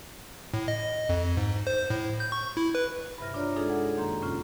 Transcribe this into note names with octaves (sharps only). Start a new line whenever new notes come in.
A2
D#5
F2
G#2
C5
A2
G6
C#6
E4
B4
G2 C3 E5 F6 A#6
D4 F4 C#5 D5 A#5
G#3 D4 D#4 F4 G#4 A4
G#3 F#5 G#6
F#2 D#3 A#3 A#5 C6 G6
A2 C3 C#4 F4